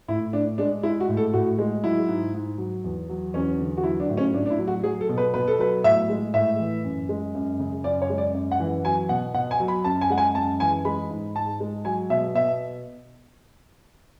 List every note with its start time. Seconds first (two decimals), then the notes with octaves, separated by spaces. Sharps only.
0.08 A2 E4
0.33 A2 D4
0.58 G#3 D4
0.83 G#3 E4
1.00 F#4
1.09 A2
1.17 A4
1.33 A2 F#4
1.59 G#3
1.83 F#3 E4
2.08 G#2
2.34 G#2
2.58 F#3
2.84 E2
3.09 F#3
3.34 E2 C#4
3.59 D3
3.77 F#4
3.83 F#3 E4
4.00 D4
4.09 A2
4.17 C#4
4.34 A2 D4
4.46 D4
4.50 E4
4.59 F#3
4.68 F#4
4.84 F#3 G#4
5.01 A4
5.09 B2
5.18 B4
5.34 B2 B4
5.48 A4
5.59 F#3 B4
5.84 A2 E5
6.10 G#3
6.34 A2 E5
6.60 E3
6.84 F#2
7.09 G#3
7.35 F#2
7.60 C#3
7.84 F#2 D5
8.02 C#5
8.10 G#3
8.18 D5
8.34 F#2
8.51 F#5
8.60 E3
8.85 F#3 G#5
9.09 B2 F#5
9.34 B2 F#5
9.51 G#5
9.60 F#3
9.68 B5
9.84 F#2 A5
10.01 G#5
10.10 G#3 F#5
10.18 G#5
10.35 F#2 A5
10.60 E3 G#5
10.85 G#3 B5
11.10 G#2
11.35 G#2 A5
11.60 G#3
11.85 F#3 G#5
12.10 B2 E5
12.35 B2 E5